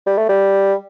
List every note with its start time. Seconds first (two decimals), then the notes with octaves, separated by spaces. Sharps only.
0.07 G3
0.18 A3
0.29 G3